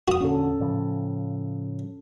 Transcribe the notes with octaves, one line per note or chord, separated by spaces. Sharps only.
F2 A#2 F#4 D#6
E2 A#2 D3 C#4 A4
A2 C#3 F3